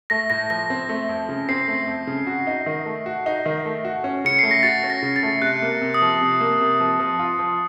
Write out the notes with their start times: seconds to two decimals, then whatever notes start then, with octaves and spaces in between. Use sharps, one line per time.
0.10 A3 A#6
0.30 A2 A#6
0.50 F3 A#6
0.70 C4
0.89 A3
1.09 F2
1.29 C#3
1.49 C4 C7
1.68 A3
1.87 F2
2.07 C#3
2.27 F#4
2.47 D#4
2.66 D#3
2.86 A3
3.06 F#4
3.26 D#4
3.46 D#3
3.65 A3
3.85 F#4
4.04 C#4
4.25 C#3 C#7
4.39 A3 C7
4.51 A#6
4.63 F#4 A6
4.84 C#4
4.90 A#6
5.03 C#3
5.16 A6
5.23 A3
5.42 C3 F#6
5.62 A#3
5.82 C3
5.94 D#6
6.02 F3
6.21 C3
6.41 A#3
6.61 C3
6.80 F3
7.00 F3
7.19 F4
7.39 F3